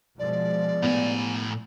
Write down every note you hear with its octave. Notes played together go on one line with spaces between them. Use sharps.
B2 F3 G#3 D5
A2 B3 G#5